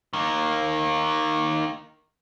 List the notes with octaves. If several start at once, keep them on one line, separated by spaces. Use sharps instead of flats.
D#3 A#3